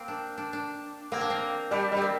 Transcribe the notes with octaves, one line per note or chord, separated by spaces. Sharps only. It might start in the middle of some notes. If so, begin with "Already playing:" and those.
Already playing: A#3 C4
D4
D4
D4
A#3 C4
D4
C4
G3 D4
G3 C4
A#3